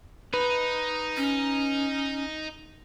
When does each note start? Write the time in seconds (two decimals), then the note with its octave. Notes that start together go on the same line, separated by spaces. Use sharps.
0.34 D#4 B4
1.17 C#4